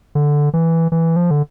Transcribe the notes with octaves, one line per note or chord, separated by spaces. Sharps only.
D3
E3
E3
F3
D3